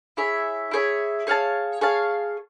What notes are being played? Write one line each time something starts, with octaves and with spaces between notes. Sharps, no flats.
E4 G#4 C#5 E5
E4 G#4 C#5 E5
G#4 C#5 F5 A5
G#4 C#5 F5 A5